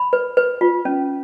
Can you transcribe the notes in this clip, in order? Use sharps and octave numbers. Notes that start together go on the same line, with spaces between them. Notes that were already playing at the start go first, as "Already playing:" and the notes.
Already playing: B5
B4
B4
F4
C#4